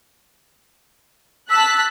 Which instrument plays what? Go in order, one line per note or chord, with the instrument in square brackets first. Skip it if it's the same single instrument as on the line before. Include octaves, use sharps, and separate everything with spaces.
[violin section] A5 F#6 B6 [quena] E6